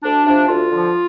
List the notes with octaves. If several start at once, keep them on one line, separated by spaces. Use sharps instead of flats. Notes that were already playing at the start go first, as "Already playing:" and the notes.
D2 D4
C3 F3 D4
D2 F4
D3 F3